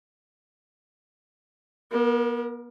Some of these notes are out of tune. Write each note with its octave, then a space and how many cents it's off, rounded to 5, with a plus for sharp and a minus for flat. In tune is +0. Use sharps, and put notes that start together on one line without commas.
B3 -40 A#4 +0